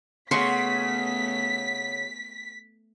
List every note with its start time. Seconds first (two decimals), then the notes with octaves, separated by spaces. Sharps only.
0.31 C#3 A3 B3 F#4 C6 C#6 B6